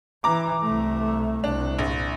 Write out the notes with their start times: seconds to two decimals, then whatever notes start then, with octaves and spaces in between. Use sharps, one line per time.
0.24 E3 A#5 D6
0.63 C2 A3
1.44 C2 D4
1.79 A#1